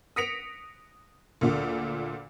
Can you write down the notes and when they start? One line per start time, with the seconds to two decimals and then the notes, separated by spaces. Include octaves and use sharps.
0.16 D#6 A#6 B6 C#7 D7 F7
1.41 D2 A#2 D3